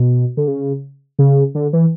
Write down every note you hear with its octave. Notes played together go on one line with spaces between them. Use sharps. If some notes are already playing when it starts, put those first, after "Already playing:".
Already playing: B2
D3
C#3
C#3
D3
E3